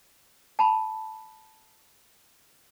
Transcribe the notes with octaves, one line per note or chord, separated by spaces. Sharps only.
A5 B5